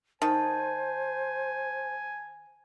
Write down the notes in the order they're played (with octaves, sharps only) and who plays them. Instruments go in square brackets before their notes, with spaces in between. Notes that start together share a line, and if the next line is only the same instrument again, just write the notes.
[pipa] D#3 [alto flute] C5 [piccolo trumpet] G#5 [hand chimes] A5